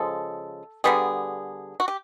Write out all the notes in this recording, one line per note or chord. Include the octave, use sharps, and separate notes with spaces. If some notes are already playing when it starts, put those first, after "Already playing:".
Already playing: C#3 F3 G#3 A4
D3 G3 B3 G#4
F#4
G4